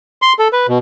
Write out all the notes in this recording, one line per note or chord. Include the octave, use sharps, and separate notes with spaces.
C6
A4
B4
B2